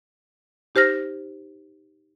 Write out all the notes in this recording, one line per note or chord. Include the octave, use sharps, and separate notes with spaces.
D#4 G4 C5 F6 A#6